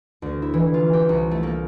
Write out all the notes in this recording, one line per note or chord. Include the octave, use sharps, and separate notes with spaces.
D2
E4
E3
F4
G4
C2
A3
A#3